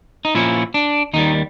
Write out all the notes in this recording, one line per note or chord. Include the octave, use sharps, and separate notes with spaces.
D#4
A#2 F3 A#3 C#4 E4
D4
D#2 D#3 G3 D#4